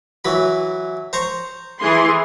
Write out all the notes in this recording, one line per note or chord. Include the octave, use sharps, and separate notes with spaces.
E3 F#3 B5
C5 A#5 C#6
E3 G#4 C6